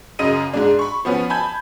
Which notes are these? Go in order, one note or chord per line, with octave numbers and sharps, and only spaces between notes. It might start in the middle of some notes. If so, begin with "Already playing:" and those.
F#2 C#3 D#5 D#7
G#2 G#3 D4
B5 C#6
F3 B3 C#4 B4
G#5 A5 B5 G6 G#6